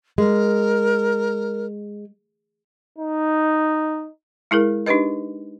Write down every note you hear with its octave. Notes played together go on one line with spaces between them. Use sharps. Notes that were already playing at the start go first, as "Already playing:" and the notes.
G#3 A#4
D#4
G#3 E4 G#4 A#4
D4 D#4 G4 B4 D#5